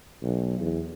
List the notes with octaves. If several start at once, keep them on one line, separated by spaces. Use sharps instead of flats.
B1
E2